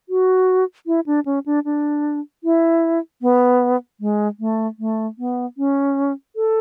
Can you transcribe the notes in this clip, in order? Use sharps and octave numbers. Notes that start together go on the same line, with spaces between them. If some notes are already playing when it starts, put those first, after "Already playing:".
F#4
E4
D4
C#4
D4
D4
E4
B3
G#3
A3
A3
B3
C#4
A4